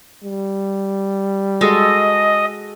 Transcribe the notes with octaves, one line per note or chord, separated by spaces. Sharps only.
G3
G#3 F#4 A4 D#5